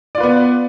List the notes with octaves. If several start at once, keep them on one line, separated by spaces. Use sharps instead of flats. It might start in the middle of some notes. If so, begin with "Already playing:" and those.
B3 F4 B4 D5